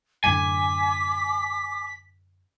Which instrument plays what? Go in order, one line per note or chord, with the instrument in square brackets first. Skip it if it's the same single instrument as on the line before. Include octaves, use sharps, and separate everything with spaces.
[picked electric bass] F#2 A2 D3 [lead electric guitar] G#5 [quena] D6 [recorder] B6